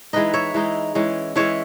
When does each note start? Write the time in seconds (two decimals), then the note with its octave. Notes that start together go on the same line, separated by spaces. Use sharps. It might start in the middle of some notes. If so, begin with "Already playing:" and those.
0.13 E3 G#3 D#4 B4 D#5
0.33 C#5 E5
0.54 E3 G#3 D#4
0.95 E3 G#3 C#4
1.36 E3 G#3 C#4 C#5 E5